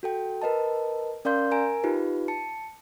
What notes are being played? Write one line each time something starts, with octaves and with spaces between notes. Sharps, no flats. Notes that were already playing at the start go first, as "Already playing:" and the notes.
F#4 A4 G5
A#4 B4 D#5 A5
C#4 A#4 D5 F5 C6 G6
A#4 G#5 A#5 D7
D#4 F4 G4 B4
A5 C#7